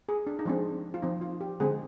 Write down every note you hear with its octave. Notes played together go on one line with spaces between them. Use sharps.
G#4
D4
D#4
F3 G#3 C4 D4
F4
F3 C4 D#4
F4
G4
D3 G#3 C4 G#4